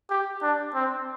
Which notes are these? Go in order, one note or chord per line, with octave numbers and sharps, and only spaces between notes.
G4
D4
C4